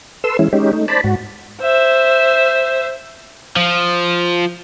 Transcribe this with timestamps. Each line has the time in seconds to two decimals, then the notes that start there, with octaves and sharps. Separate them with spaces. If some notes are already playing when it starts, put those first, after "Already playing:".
0.24 A4 B4 C6 E6
0.39 E3 G#3 C#4 E4
0.53 G#3 C#4 D#4 G4
0.73 A3 D#4
0.88 C5 D5 A5 B5
1.04 G#2 F#4
1.61 C5 E5
3.57 F3